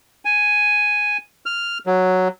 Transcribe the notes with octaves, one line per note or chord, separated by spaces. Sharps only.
G#5
F6
F#3